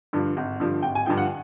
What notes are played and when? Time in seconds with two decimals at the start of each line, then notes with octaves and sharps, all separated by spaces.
0.13 G2 D3 F3
0.37 G#1
0.60 G2 D3 F3
0.83 G#1 G5
0.95 G#5
1.06 G2 D3 F3 G5
1.17 F#5